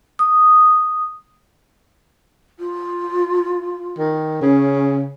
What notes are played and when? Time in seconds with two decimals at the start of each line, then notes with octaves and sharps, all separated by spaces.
0.19 D#6
2.59 F4
3.98 D#3
4.42 C#3 C#4